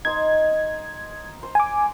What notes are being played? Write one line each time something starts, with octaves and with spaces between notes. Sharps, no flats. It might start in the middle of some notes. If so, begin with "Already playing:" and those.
D#4 C5 C6 G#6
C5
G#5 D6